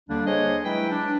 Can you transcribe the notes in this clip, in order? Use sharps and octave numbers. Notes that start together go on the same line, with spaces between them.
D#2 D3 G3 A#3 D4
A#3 D4 G#4 C5 C#5 D#5
F#3 G#3 E4 B4 G5
D4